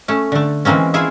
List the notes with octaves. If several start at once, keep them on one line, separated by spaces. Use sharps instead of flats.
A3 C#4
D3 A3
E3 G#3 A#3 C4 C#4
E4 F4 G#4 E5